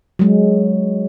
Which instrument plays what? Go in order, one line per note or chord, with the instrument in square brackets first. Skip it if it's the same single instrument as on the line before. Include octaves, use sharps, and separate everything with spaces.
[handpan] F#3 G#3